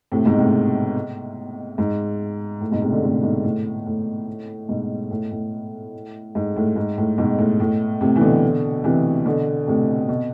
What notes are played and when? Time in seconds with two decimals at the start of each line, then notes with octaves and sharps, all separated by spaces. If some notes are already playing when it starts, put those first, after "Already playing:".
0.12 A2 C3
0.26 G#2 B2
0.39 A2 C3
1.78 G#2
2.61 A2
2.71 G#2 B2
2.82 A2 C3
2.92 B2 D3
3.03 A2 C3
3.23 G#2 B2
3.44 A2
3.86 A2
4.69 G#2 B2
5.11 A2
5.31 A2
6.35 G#2
6.56 A2
6.76 G#2
6.98 A2
7.18 G#2 B2
7.39 A2
7.60 A2
8.01 A2 C3
8.16 E3
8.21 B2 D3
8.84 C3 E3
9.26 B2 D3
9.67 A2 C3
10.09 B2